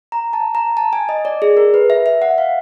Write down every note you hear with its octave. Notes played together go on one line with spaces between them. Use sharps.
A#5
A5
A#5
A5
G#5
D#5
D5
G#4
A#4
B4
E5
E5
F#5
F5